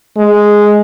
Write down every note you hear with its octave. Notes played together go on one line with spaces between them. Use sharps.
G#3